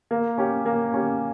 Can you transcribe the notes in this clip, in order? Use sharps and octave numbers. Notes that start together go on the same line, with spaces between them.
A#3
C#4 G4
A#3
C#4 G4